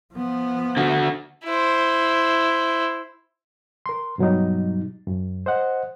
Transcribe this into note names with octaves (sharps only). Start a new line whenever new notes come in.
F3 B3
D3 F#4
E4 C5
A#4 C6
G2 B2 F#3 G3 D#4
F#2
C5 D#5 F#5